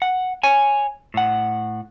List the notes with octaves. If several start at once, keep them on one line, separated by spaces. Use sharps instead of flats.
F#5
C#5 G#5
A2 F#5